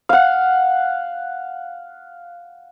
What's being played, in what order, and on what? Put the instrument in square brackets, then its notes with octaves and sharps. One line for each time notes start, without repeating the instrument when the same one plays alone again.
[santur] F5 F#5